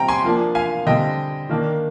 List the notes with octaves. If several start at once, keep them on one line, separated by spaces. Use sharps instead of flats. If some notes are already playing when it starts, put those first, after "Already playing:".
Already playing: C3 G3 C4 G5 A#5
G#5 C6
F3 A#3 D4
F5 G#5
D3 G3 C4 D#5 G5
D#3 A#3 D4